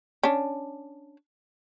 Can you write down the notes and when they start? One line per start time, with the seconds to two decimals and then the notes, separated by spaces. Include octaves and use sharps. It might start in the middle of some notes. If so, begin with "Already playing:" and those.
0.23 C#4 D4